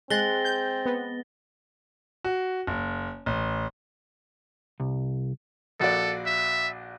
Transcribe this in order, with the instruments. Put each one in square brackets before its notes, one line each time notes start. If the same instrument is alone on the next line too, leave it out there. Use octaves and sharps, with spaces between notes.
[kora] G#3 [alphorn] C4 [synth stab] F#6 [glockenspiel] A6 A#6 G7
[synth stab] G6
B3
[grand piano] F#4
F#1
A1
[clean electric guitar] C2
[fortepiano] A#1 F#4 D5 [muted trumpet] A4
[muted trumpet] E5